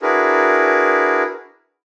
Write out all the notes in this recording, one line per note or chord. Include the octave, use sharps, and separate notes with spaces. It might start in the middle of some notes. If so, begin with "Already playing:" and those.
D4 E4 F#4 G#4 A#4 B4